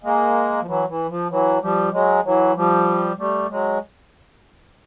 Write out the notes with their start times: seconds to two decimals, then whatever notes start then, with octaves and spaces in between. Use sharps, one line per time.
0.03 G#3 A#3
0.61 F3
0.66 E3 F#3
0.88 E3
1.09 F3
1.30 E3 F#3
1.61 F3 G3
1.92 F#3 G#3
2.24 E3 F#3
2.55 F3 G3
3.18 G3 A3
3.50 F#3 G#3